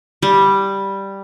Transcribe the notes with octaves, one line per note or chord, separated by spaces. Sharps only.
G3